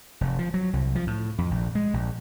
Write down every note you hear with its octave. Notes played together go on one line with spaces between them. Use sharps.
F1
F3
F#3
C2
F3
A2
F2
A#1
G#3
A#1